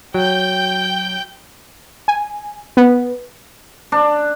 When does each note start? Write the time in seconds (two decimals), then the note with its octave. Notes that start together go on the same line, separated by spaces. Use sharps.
0.14 F#3 G5 G6
2.08 G#5
2.77 B3
3.92 D4